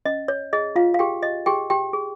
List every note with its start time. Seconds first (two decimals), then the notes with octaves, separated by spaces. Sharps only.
0.05 C#4 D#5
0.28 C#5
0.53 G#4 D#5
0.76 F4 F5
0.94 F5
0.99 G4 G#4 G5
1.23 D#5
1.46 G4 G#4 G5
1.70 G4 G5
1.93 G#4